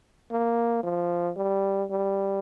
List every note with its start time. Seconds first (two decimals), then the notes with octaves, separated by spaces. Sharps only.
0.31 A#3
0.83 F3
1.37 G3
1.91 G3